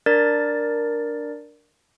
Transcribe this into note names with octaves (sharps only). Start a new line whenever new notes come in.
D4 A#4 D5 A6